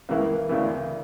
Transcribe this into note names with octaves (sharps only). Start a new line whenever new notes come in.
C#2 C#3 E3 A#3
D2 C#3 E3